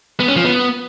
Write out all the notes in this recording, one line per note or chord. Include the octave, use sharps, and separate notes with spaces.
B3
C#4
F3
B3